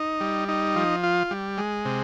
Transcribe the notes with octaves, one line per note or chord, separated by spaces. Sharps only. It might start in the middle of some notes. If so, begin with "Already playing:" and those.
Already playing: D#4
G3
D#4
F3
F4
G3
G#3
C3